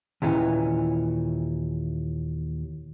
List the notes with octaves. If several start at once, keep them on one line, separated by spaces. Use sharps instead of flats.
D#2 A#2 E3 C#4